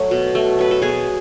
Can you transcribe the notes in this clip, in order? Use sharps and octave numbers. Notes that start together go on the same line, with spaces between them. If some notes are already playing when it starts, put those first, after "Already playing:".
Already playing: F#3 A3
B2
A3
F#3 B4
A4
B2 G#4